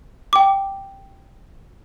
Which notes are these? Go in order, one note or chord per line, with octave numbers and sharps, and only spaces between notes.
G5 D6